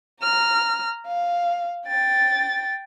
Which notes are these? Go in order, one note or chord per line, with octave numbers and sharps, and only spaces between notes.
A#5 F6
F5
G5 A6